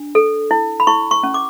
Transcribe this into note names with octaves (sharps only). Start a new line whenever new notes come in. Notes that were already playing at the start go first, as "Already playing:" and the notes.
Already playing: D4
A4
E4
B5
E4 C#6
C#6
C#4
D6